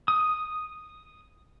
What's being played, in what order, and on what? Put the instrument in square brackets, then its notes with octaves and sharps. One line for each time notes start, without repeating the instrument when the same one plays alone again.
[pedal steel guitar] D#6